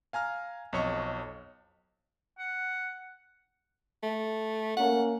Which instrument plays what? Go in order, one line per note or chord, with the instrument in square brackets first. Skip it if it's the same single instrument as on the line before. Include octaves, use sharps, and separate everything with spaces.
[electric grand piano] F5 G#5 A#5 F6
B1 F2 C#5 D#5 C#6
[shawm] F#5
[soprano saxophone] A3
[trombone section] A#3 C#4 A#4 [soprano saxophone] F#5